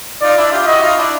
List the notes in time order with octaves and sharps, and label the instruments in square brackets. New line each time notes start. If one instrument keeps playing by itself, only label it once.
[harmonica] D#4 F4 [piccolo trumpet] D5
[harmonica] D4 E4
F4 G4
F4
[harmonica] E4 F#4 [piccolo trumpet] D#5
[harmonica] D#4 F4
D4 E4